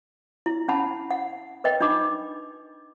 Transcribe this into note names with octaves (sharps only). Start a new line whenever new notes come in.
E4
C#4 F#5 A5 B5
F#5
A#4 B4 D#5 G5
D4 D#4 B5 D6